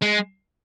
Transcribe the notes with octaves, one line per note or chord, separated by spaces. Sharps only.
G#3